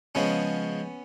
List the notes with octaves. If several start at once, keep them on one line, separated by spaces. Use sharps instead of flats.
C#3 F3 G#3 B3 C#4